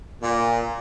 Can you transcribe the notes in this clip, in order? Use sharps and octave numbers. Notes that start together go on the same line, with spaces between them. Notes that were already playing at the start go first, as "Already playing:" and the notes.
A#2